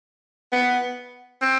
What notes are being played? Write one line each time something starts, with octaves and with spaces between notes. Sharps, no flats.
B3
C4